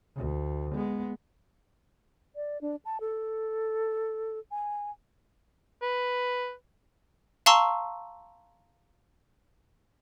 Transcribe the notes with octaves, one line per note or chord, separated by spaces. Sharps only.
D2
G#3 B3
D5
D4
A5
A4
G#5
B4
F5 A5 A#5 C6 C#6 E6